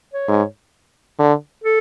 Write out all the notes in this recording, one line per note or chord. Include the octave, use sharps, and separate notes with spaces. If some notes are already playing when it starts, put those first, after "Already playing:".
C#5
G#2
D3
A4